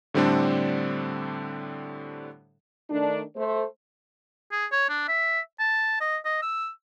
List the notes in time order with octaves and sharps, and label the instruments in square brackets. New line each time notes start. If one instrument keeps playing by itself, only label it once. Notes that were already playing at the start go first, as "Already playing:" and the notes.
[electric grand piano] A2 D3 G3 C4 D4 A4
[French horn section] D#3 A3 D4
A3 C5
[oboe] G#4
C#5
D4
E5
A5
D#5
D#5
E6